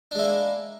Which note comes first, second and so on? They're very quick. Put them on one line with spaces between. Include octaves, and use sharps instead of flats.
D4 G#3 E4 A#3